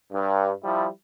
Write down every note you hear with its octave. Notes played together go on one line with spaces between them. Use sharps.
G2
F3 G3 E4